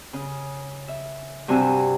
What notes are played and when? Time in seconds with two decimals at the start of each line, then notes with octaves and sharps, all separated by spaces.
0.13 C#3
0.88 E5
1.48 G2 C3 F#4 G#5 E6